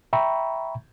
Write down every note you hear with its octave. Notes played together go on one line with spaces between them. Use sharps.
E5 G5 A#5 B5 C#6